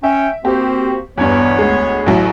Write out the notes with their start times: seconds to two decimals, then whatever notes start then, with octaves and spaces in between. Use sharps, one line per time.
0.03 C#4 E5 G5
0.45 A#3 C4 F#4 G4 C5
1.18 E2 G2 B3 C#5
1.59 D2 G#3
2.06 A1 F#3 E4